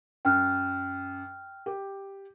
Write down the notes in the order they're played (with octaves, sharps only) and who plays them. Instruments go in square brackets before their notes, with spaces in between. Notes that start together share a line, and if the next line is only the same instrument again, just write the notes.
[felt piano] F#2 [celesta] G5 F6 F#6
[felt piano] G4